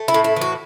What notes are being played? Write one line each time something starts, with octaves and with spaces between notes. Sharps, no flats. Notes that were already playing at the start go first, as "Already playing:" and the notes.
Already playing: A3
E4
A2
E4
E3
F#4